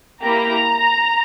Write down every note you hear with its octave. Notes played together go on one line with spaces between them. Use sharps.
A#3 E4 G4 A#5